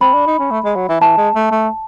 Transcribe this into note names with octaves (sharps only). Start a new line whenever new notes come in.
C4 B5
D4
D#4
C#4
A3
G#3
F#3
E3
E3 A5
G#3
A3
A3